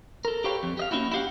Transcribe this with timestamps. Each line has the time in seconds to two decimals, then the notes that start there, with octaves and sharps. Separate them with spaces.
0.25 A4 A#4
0.44 G4 A4 B4 C#5 F5 G5
0.63 F2
0.77 G4 D#5 F5
0.91 A#3 C#4 D#4 E4 F#4
1.12 E4 F#4 G4 F5 F#5